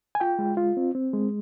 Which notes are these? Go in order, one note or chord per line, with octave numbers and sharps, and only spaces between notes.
G#5
F4 G5
G#3
F4
C4
C4
G#3